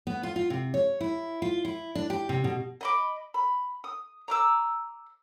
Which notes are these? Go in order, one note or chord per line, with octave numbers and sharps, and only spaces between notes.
B3
F4
F4
C3
C#5
E4
F4
E4
D4
G4
C3
B2
D#5 B5 D6
B5
D#6
A#5 D6 E6